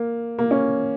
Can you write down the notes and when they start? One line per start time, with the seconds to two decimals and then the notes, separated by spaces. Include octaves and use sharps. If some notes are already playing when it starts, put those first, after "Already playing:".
Already playing: A#3
0.39 A#3
0.51 C#4